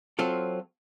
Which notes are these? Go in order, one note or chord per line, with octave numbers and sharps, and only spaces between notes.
F#3 C4 F4 A4